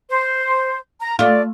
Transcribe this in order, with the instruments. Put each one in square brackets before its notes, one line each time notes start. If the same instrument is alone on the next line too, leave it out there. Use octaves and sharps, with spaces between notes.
[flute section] C5
A#5
[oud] A3 F4 [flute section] D5